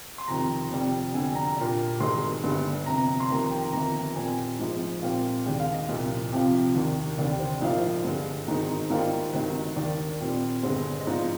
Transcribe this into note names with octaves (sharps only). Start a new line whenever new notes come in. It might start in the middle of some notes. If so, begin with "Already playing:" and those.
C6
F1 F2 D#3 A#5
F1 F2 C3 G3
F2 D3 G3 G#5
A#5
A#2 G3 D4
G#1 G2 D#3 G#3 D#4 C6
G1 G2 D3
G1 F2 C3 A#5
C6
F1 F2 D#3 A#3 A#5
G5
A#5
G1 F2 D#3 A#3 A#5
A#2 G3 C4 G#5
A#1 G#2 F3 G#3
A#2 G3 C4 F5
D#2 D#3 G#3 D4 G5
F5
D#5
C2 A#2 F3 D#5
F2 C3 F3 C4 F4
D#2 D#3 A#3 D4
F1 D#2 D3 G3 D5
C5
A#1 G#2 F3 A#3 F4 D5
G2 D3 G#3
G#1 G#2 D#3 G#3 D#4
G#2 D#3 G3 A#3 F4
G#1 G2 D#3
D#2 D#3 A#3 D4 D5
A#2 G3 C4
G1 G2 D3 G#3 C5
D#5
G#2 F3 G#3 D4 F4 D5